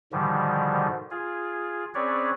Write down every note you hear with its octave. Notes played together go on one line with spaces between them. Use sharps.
G#2 B2 D3 D#3 F3 G3
F4 G#4
C4 C#4 G#4 B4 C#5 D5